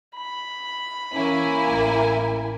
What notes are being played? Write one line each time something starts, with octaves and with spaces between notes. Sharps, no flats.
B5
E3 A#3 C#4 E4 G#5
A1